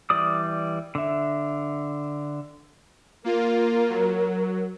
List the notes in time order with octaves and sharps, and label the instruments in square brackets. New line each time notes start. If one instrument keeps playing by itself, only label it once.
[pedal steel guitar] E3 G3 D5 D#6
D3 E5
[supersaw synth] A#3 F4 [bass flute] A#4
[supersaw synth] F#3